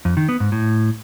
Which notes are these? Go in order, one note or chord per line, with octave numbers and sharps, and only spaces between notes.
F2
D#3
B3
G#2
A2